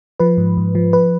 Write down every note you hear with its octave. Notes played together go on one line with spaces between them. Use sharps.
F3 B4
G#2
G#2
F3
B4